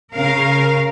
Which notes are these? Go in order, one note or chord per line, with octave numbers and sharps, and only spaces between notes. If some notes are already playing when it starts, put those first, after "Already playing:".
C#3 A#4 F5